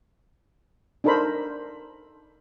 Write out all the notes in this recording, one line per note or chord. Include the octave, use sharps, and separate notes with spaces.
D4 D#4 A4 A#4 C5 B5